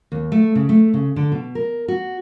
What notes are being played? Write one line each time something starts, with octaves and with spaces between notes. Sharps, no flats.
D#2
A3
C#3
A3
C#3
D3
B2
A#4
F#4